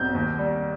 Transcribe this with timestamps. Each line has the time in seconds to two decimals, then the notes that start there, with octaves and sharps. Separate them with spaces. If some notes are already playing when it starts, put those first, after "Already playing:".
Already playing: B1 G6
0.15 D#2
0.39 G3